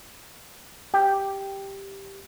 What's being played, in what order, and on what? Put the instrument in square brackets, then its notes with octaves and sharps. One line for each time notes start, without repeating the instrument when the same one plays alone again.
[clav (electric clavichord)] G4 [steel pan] G5